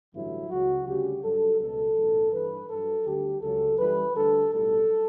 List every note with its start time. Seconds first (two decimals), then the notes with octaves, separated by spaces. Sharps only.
0.13 A1 G2 D3 F#3 E4
0.50 C#2 C#3 F#3 F#4
0.86 D2 C#3 G3 G4
1.22 G2 F#3 A4
1.59 C#2 B2 F#3 A4
1.96 B1 A2 E3
2.32 G2 E3 G3 B4
2.68 G2 F#3 A4
3.05 D2 D3 G3 G4
3.41 C#2 C#3 F#3 A4
3.77 F#2 E3 G3 B4
4.15 D2 D3 G3 A4
4.51 B1 A2 G3 A4